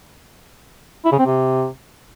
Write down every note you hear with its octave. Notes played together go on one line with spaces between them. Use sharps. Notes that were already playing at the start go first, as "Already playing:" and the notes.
E4
C#3
C4
C3